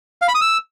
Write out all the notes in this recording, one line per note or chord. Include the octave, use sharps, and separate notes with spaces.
F5
B5
D#6
E6